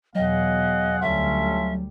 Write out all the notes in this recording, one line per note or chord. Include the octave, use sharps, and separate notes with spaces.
E2 B2 F#3 G#4 D#5 F5 F#5
D2 G3 C#4 F4 A4 E5